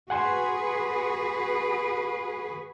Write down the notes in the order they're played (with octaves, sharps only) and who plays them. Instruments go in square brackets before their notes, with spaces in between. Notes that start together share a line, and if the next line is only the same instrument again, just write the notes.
[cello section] F#4 G#4 B4 [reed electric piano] F#5 G#5 C6